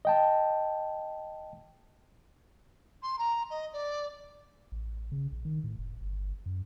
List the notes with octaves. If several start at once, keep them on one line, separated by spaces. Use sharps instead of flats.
D#5 G5 A5
C6
A#5
D#5
D5
A1
C#3
A#1
D#3
A2
F1
G1
F#2